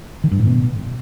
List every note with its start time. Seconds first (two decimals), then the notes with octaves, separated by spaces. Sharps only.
0.24 D#3
0.31 G2
0.39 A2
0.47 B2